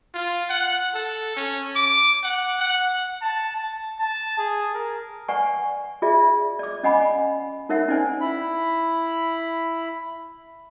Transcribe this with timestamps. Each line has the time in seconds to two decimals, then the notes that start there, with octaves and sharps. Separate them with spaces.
0.14 F4
0.50 F#5
0.94 A4
1.37 C#4
1.76 D6
2.23 F#5
2.60 F#5
3.22 A5
3.56 A5
4.00 A5
4.39 G#4
4.75 A#4
5.28 B4 D5 F#5 G#5 C#6
6.02 F4 G#4 D5 E5
6.59 D5 D6
6.83 C#4 D#5 F#5 G#5 B5 D6
7.69 D#4 A#4 C#5 E5 F#5
7.88 C#4 D#4 C5 D5 G#5
8.21 E4 B5